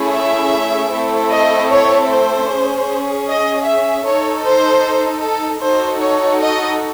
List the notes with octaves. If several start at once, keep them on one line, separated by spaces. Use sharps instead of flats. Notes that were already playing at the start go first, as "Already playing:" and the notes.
Already playing: A3 C#4 E4 G#4
E5
A3 C4 E4 A4
D#5
C#5
C5
C#4 G#4
D#5
E5
D#4 A4 C#5
C5
A4
D#4 F#4 A4 C5
C#5
D#5